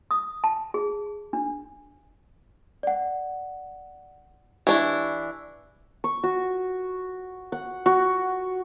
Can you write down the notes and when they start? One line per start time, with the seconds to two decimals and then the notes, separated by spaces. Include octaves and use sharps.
0.11 D#6
0.44 A5
0.74 G#4
1.33 D4
2.83 D5 F#5
4.67 E3 D4 E4 G4 G#5 C#6
6.04 C#6
6.23 F#4
7.52 F#5
7.86 F#4